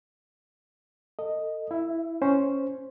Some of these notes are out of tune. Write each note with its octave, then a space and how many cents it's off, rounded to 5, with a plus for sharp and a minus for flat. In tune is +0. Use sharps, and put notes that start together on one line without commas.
A4 +35 D#5 +0
E4 +0 E5 +35
C#4 +0 C5 +0